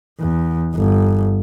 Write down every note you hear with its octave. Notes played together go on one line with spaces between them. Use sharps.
E2
G1